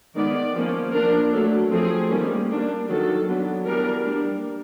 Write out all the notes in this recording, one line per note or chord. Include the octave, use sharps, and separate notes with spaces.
D#3 G#3 B3 D5
F3 A#3 C#4
F3 A#3 D4 A#4
F#3 A3 D4 A4
F3 A3 C4 G#4
D#3 G3 A#3 C#4
G3 A#3 D4
D#3 F#3 A#3 A4
F#3 B3 D4
E3 G3 B3 D4 A#4
G3 A#3 D4